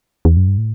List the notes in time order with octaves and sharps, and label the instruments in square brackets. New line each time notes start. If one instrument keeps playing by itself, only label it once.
[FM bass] E2
F#2
G2
A2